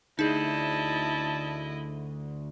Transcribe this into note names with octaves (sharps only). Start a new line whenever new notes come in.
D2 D#4 E4 G#4 D#5 A5